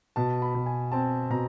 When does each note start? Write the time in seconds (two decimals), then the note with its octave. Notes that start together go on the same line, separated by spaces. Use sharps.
0.16 B2 A5
0.42 B5
0.55 B2
0.66 G#5
0.92 C4 A5
1.30 B2 A#5